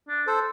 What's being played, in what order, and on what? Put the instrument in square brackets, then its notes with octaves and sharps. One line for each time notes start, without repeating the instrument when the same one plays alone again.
[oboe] D4
[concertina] A4 C5